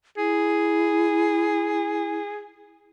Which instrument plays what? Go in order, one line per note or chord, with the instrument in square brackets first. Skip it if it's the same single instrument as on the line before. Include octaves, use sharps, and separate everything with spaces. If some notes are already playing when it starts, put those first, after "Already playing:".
[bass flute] E4 [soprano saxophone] G#4